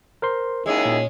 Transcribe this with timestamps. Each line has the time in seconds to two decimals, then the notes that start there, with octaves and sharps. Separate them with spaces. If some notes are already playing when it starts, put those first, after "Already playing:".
0.22 A#4 C5 C6
0.66 D#2 G#3 C#4 E4 G#4
0.86 A#2